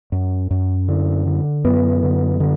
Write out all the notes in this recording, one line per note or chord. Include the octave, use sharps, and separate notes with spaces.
F#2
F#2
D3
D3
F#2 B3
D3
D3